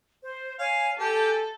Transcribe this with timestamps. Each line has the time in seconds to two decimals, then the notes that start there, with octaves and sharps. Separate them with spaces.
0.24 C5
0.59 C#5 F5 G#5
0.99 G4 A4 G#5 G6